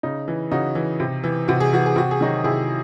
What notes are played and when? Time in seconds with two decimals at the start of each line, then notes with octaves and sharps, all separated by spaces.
0.03 C#3 D#4
0.28 E3
0.51 C#3 D#4 F#4
0.75 E3
1.00 C3
1.24 E3
1.48 C3 F#4
1.60 G#4
1.73 E3 F#4
1.86 G#4
1.96 C3 F#4
2.11 G#4
2.21 D#3 F#3 D#4 F#4
2.44 C3 E4 G#4